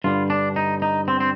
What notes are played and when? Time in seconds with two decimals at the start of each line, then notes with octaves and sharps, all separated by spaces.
0.04 G2 D3 G3 F4
0.30 D4
0.56 D#4
0.82 D#4
1.08 C4
1.20 C4